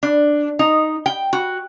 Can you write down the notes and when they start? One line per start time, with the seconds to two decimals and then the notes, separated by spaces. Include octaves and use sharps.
0.03 D4
0.59 D#4
1.06 G5
1.33 F#4